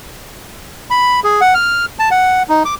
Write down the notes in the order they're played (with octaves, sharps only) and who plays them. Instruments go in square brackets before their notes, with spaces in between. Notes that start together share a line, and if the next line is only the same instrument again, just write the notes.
[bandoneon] B5
G#4
F#5
F6
A5
F#5
D#4
D6